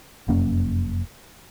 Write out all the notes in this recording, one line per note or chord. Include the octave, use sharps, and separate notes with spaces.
F1 F#2 A#3 C#4